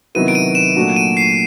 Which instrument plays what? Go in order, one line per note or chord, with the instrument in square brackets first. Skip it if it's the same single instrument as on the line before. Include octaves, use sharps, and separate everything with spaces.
[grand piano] C3 D#3 F#3 B3 E4 [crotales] D#7
[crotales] D7
D#7
E7
[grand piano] A#2 F#3 A3 D4 F#4
[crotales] D#7
C7